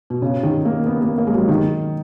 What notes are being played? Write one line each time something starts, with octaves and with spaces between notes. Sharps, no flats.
B2
C#3
D#3
A#3
B3
A#3
A#3
G#3
F#3
D#3